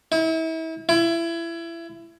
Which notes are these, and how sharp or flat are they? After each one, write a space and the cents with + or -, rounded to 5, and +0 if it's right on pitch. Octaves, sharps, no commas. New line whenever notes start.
E4 -35
E4 +25